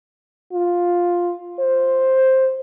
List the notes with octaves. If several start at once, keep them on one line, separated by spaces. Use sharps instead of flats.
F4
C5